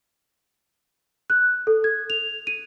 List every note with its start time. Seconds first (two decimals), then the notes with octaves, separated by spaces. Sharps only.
1.30 F#6
1.67 A4
1.84 G#6
2.10 F7
2.47 D#7